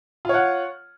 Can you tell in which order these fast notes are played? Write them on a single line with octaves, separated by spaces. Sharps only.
F4 C#5 F#5